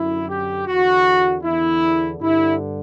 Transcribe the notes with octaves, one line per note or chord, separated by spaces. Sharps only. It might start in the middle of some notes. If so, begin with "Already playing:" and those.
Already playing: F#2 D3 E4
G4
E2 D3 F#4
E2 D3 E4
G2 D3 E4